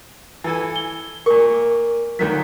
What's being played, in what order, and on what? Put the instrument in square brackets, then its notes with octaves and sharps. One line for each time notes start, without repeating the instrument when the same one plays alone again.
[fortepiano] E3 A4 G#5
[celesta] G7
[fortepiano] A#2 C#6 [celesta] A#4
[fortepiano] D2 D#3 F#3 [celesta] B6